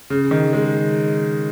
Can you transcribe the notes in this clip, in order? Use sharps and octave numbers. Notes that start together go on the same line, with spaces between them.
C#3
D#3
G#3